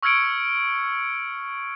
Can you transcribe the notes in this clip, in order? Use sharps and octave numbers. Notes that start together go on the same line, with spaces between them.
C#6 E6 F6 G#6 C#7 D7